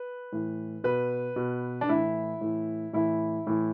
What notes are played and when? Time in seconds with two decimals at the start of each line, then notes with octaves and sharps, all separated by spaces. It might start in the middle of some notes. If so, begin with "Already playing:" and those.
Already playing: B4
0.32 A2 E3
0.84 B2 B4
1.36 B2
1.81 D4
1.88 A2 E3 E4
2.41 A2 E3
2.93 A2 E3 E4
3.47 A2 E3